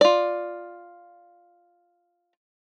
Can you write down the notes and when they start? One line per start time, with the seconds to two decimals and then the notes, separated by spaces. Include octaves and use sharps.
0.01 F4 D5